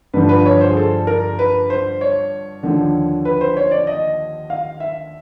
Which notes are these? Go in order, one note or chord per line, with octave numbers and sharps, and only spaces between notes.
G2 D3 F3 B4
B4
C#5
C5
G#4
A4
A#4
B4
C5
C#5
D#2 D3 F3
B4
C5
C#5
D5
D#5
F5
E5